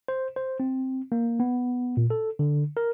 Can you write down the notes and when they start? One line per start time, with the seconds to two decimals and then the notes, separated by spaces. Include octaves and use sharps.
0.08 C5
0.36 C5
0.60 C4
1.12 A#3
1.40 B3
1.97 A#2
2.10 A4
2.39 D3
2.77 A#4